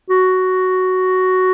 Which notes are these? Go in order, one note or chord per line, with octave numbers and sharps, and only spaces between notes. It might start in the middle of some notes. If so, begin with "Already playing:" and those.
F#4